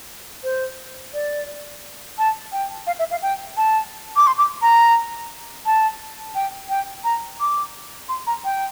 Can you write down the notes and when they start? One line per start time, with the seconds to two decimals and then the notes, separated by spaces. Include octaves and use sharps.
0.43 C5
1.13 D5
2.18 A5
2.52 G5
2.87 F5
2.99 E5
3.11 F5
3.22 G5
3.57 A5
4.16 D6
4.27 C6
4.38 D6
4.62 A#5
5.66 A5
6.35 G5
6.69 G5
7.04 A#5
7.40 D6
8.09 C6
8.27 A#5
8.44 G5